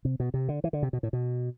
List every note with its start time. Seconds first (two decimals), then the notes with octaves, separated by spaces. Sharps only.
0.05 C3
0.20 B2
0.34 C3
0.49 D3
0.64 E3
0.73 D3
0.83 C3
0.93 B2
1.03 A2
1.13 B2